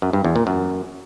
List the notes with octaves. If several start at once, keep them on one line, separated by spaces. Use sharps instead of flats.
F#2
G2
E2
A#2
F#2